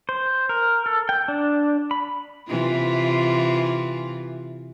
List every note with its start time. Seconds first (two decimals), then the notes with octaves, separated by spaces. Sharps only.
0.09 C5
0.49 A#4
0.86 A4
1.09 G5
1.28 D4
1.91 B5
2.48 C3 E3 F4